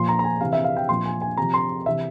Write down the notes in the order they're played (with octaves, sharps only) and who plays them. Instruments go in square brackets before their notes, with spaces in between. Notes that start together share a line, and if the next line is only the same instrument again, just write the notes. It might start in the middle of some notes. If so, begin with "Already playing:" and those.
Already playing: [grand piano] A#2 F3 C6
A#5
A#5
G#5
C3 E3 F5
E5
F5
G5
A#2 F3 C6
G#5
G#5
C3 F3 A#5
C6
C3 E3 E5